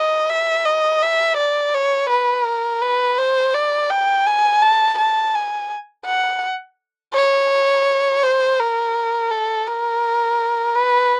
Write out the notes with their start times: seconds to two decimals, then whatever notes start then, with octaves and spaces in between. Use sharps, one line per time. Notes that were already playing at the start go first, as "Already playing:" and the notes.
Already playing: D#5
0.30 E5
0.65 D#5
1.02 E5
1.37 D5
1.74 C#5
2.10 B4
2.46 A#4
2.82 B4
3.18 C5
3.54 D5
3.90 G5
4.27 G#5
4.62 A5
4.99 A5
5.35 G#5
6.06 F#5
7.14 C#5
8.23 C5
8.60 A#4
9.31 A4
9.67 A#4
10.75 B4